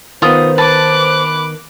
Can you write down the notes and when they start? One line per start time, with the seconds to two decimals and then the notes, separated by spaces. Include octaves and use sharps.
0.22 D#3 B3 F4 C5 D#6
0.58 B4 A5 D6 F#6